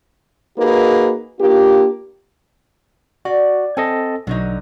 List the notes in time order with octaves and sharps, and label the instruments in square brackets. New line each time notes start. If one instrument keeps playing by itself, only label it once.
[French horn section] A#3 D#4 F#4 G#4 B4
A#3 D4 F4 G4
[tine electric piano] F#4 [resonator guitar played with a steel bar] D5
[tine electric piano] C4 A4 D#5 [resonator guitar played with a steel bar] G#5
[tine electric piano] B1 [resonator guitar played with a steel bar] D3 F#3 D#4